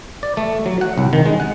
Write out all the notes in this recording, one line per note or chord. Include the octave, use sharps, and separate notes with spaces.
D5
A3
F#3
F#5
C2
D#3
G#3
F#5